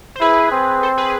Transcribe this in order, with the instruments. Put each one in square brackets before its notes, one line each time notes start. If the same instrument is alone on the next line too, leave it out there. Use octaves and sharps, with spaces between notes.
[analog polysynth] C5
[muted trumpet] E4 [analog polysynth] G#4 B4
[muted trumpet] C4
[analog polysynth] A4 C5
G#4 B4